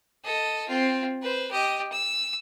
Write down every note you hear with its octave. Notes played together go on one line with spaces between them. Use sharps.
A4 D#5
C4 F4
B4 C5
G4 D#5
E6